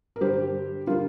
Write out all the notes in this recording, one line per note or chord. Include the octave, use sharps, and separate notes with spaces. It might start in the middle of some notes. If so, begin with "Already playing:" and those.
A#4
G2 D3 G3 G4 C5
D3 G3 F4 A#4